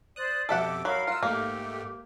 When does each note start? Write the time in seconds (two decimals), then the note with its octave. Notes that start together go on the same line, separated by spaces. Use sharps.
0.16 C5 D5 D#6 F#6
0.49 F2 B2 G4 A4 E5 F#5 D6
0.85 F#3 A#4 F5 B5
1.07 F4 F#5 E6
1.23 G#2 A3 A#3 G4